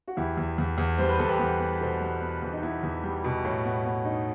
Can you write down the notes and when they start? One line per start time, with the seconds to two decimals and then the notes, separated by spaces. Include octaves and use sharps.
0.08 F#4
0.16 E2 E4 G4
0.37 E2
0.58 E2
0.78 E2
0.98 G3 C5
1.08 B4
1.18 E2 A4
1.29 G4 B4
1.40 E2
1.59 B3
1.80 B2 A4 C5
2.01 G3
2.21 B3
2.42 E2
2.53 D#4
2.62 B3 E4
2.83 E2
3.03 G3
3.24 B2
3.45 A2
3.65 B3
3.84 B3
4.05 D#4